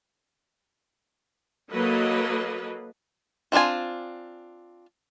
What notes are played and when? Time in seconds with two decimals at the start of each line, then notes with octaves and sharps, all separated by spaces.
1.72 F#3 A#3 A4 B4 D#5
3.52 E3 C4 D4 F4 G#5